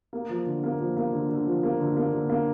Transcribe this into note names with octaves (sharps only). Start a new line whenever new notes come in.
A#3
F3
D3
A#3
F3
A#3
D3
D3
F3
A#3
D3
A#3
D3
A#3